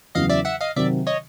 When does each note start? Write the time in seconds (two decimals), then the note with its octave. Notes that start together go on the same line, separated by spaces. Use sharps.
0.15 E2 C#3 F#3 D#5 F5
0.29 D5 E5
0.45 E5 F#5
0.61 D#5 F5
0.76 C3 D#3 F#3 D5 E5
1.07 C#5 D#5